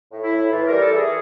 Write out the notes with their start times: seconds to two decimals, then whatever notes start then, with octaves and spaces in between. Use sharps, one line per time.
0.12 A2
0.22 E4
0.32 A2
0.51 E3 F4
0.67 G3 A#4
0.81 A4
0.91 E3 G#4